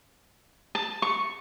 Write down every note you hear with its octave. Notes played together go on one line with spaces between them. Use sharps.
A5
C#6